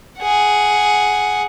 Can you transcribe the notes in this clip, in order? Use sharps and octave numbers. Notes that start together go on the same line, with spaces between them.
G#4 F#5